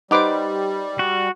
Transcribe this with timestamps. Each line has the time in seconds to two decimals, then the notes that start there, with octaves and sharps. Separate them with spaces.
0.11 G3 D#4 B4 C5 F#5 D6
0.99 F#4